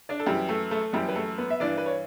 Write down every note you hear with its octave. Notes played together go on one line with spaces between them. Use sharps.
D4 D5
A4
F#2 E3 G3 G4
A3 A4
A3 A4
F#2 E3 G3 G4
B4
A3 A4
B3 B4
E5
G2 E3 D4 D5
B4
C#5